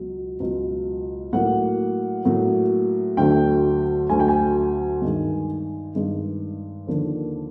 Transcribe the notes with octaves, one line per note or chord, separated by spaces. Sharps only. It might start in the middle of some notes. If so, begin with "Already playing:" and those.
Already playing: C#2 B2 F#3
C#2 B2 F#3
A2 F#3 A#3 F#5
A2 F#3 A#3
D2 D3 F#3 A3 G5
D2 D3 F#3 A3 G#5
G5
G#5
G2 D#3 G#3
G2 D#3 G#3
D#2 D3 F3 A#3